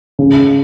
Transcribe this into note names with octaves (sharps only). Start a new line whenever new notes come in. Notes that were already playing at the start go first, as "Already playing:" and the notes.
C#3